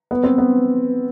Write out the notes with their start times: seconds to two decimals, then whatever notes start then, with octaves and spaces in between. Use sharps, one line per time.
0.11 B3
0.23 C4
0.38 B3